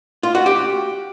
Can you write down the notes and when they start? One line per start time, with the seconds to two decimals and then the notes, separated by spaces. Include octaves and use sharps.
0.23 F4
0.35 F#4
0.46 G4